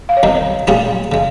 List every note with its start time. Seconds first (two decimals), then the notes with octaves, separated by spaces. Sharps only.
0.09 F5
0.17 C#5
0.23 C2 C3 D#3 D#5
0.67 A#2 G3 C#4 F4 G#4
1.12 C#3 G#3